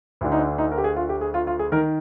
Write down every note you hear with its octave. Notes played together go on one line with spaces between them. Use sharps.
D2 D3
D#4
D4
D#4
A#4
G4
G#4
F4
G4
G#4
F4
F4
G#4
D#3 A#4